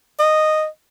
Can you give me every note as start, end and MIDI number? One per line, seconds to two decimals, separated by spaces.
0.19 0.66 75